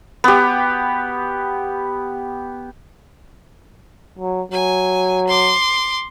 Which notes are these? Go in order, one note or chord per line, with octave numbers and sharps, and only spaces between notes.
B3 G4
F#3
F#3 G#5
C6 D6